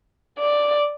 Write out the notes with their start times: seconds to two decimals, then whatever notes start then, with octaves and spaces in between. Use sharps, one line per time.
0.38 D5